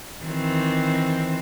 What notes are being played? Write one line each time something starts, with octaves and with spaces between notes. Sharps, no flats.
D#3 E3 C4